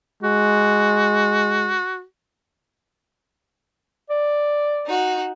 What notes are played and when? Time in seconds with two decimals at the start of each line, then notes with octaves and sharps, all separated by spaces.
0.23 G#3 F#4
4.10 D5
4.87 D#4 F#4